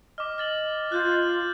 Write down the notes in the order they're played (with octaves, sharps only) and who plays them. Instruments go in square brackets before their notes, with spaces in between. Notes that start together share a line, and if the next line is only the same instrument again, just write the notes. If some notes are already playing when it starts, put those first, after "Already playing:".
[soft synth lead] D#5 [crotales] D6 F6
[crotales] F6 A6 F#7
[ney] F4 [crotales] F#6 G6 A6